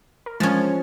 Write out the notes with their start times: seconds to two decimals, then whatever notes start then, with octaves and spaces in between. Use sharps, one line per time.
0.26 A#4
0.40 F3 G#3 C#4 G#6